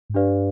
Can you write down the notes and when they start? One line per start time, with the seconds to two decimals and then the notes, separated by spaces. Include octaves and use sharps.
0.10 G#2
0.14 G2 D4 G4 B4 D5 F5